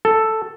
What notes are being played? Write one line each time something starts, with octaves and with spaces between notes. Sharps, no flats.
A4